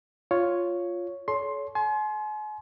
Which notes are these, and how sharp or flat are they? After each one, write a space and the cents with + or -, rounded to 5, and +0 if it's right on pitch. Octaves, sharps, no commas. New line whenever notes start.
F4 +0 C#5 +0
A4 -35 C#5 +25 C6 +10
G#5 +40 C6 +0